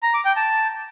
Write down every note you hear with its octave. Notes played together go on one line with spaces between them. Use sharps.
A#5
D6
G5
A5